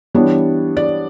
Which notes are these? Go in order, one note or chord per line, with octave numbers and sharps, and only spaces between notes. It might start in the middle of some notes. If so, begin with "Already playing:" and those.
E3 G3 B3 D4 C#5
D5